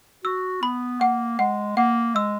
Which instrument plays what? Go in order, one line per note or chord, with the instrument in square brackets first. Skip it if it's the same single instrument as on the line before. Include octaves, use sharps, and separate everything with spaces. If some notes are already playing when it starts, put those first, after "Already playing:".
[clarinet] F#4 [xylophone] E6
[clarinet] B3 [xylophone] B5
[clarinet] A#3 [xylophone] F#5
[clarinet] G#3 [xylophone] F#5
[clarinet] A#3 [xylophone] F#5
[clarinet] G#3 [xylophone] E6